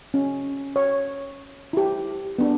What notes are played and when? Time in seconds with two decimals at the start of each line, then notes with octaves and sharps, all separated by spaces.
0.14 C#4
0.76 C#5
1.73 E4 G4
2.39 B3 D4